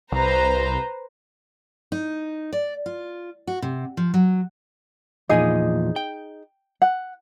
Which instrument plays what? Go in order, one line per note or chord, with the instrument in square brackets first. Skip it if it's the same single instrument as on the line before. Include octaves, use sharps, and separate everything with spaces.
[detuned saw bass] C2 [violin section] B4 C5 A#5
[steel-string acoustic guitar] D#4
D5
F4
F#4
C3
F3
F#3
[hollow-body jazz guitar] E2 A#2 F3 [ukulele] D#4 G#4 D#5
[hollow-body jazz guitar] G5
[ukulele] F#5